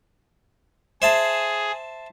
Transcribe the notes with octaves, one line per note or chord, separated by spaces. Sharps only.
G#4 C5 E5 A5